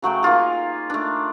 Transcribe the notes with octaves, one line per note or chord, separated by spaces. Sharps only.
C#3 F#3 A3 G5
A#3 D#4 F4 G#4
A3 D4